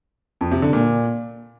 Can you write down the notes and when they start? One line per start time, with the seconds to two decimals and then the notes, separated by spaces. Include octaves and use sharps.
0.41 F2
0.51 C3
0.62 D3
0.73 A#2